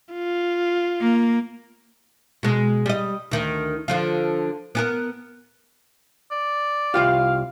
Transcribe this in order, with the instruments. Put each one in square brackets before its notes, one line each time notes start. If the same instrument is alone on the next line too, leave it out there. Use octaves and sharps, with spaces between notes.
[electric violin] F4
[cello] A#3
[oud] B2 G#3
G3 D#5
D2 D#3
D3 F3 F4
B3 G4 A#4
[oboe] D5
[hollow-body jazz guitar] C2 F4 G4 [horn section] F5